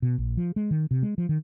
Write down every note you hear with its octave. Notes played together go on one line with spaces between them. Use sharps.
B2
A#1
F3
G#3
D#3
C3
G#3
F3
D#3